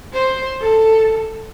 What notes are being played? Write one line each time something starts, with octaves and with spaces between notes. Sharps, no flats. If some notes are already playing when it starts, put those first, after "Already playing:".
C5
A4